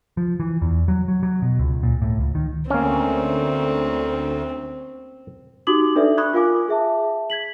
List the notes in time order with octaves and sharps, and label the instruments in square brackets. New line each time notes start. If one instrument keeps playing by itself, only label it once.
[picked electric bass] F3
E3
E2
F#3
F#3
F#3
B2
C#2
A#2
A2
C#2
D#3
[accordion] D2 [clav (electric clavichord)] A#3 C#4 [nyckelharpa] C4
[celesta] D#4 F#4 G4 D6 D#6 F#7
D4 D#4 A4 B4 D5 E5
B5 C#6 D#6 F#6 G#6
F4 A#4 F5 G#5 D6
G#4 E5 A5
G#6 B6 F#7